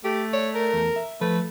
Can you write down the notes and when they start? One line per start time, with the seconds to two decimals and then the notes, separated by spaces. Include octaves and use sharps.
0.04 A3 G4
0.33 C#5 D5
0.55 A#4
0.73 E2 A4
0.96 E5
1.21 F3 A3 B4